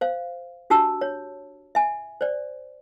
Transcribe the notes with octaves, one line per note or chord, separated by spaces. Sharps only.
C5 F5
D4 F#4 G4 A5 E6
C#5
E5 G#5
C5 D5